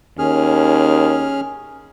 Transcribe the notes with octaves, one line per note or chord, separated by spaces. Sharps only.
D#2 C#4 G#4 F6